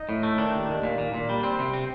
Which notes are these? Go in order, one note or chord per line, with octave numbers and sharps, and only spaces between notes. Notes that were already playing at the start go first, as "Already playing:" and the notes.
Already playing: D#4
A2
A3
D#3 D4
D#2
D#2
A#2
A#2
A#2
G3
C4
C3
C4